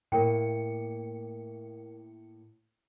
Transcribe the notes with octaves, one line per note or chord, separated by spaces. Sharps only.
A2 A#3 A#4 G5 C#7